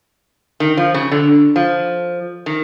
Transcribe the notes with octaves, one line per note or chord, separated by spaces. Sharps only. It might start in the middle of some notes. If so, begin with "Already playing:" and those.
D#3
F3
C#3
D3
F3
D#3